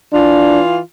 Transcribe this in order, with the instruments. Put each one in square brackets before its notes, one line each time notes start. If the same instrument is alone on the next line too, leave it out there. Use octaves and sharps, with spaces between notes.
[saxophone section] E3 F4 [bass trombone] D4